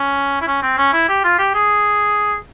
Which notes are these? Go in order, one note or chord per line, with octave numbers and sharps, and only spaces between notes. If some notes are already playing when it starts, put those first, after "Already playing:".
Already playing: C#4
E4
C#4
C4
C#4
E4
G4
F4
G4
G#4